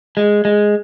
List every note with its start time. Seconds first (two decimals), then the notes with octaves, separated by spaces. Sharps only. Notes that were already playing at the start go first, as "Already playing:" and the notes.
0.17 G#3
0.45 G#3